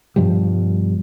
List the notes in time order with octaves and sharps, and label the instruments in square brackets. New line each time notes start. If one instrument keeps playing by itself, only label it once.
[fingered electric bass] G2 B2 F3 G3